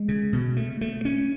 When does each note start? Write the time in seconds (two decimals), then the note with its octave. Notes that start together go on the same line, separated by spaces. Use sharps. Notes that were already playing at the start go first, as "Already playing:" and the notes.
Already playing: G#3
0.08 C#3
0.33 B2
0.57 A3
0.81 A3
1.05 C#4